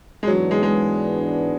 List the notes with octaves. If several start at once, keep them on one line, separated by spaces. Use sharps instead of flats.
G#3
G#2 E3 F#3 B3 D4
G#3
G#3